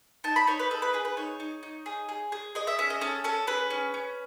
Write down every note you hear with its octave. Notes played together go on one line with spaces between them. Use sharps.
D#4 A5
B5
D#4 C#5
B4
G#4 A4
B4
G#4 B4
B4
D#4 C#5
D#4
D#4
G#4
G#4
G#4
G#4 D#5
E5
C#4 E5
D#5
C#4 A4
C#4 A4
G#4 B4
C#4
C#4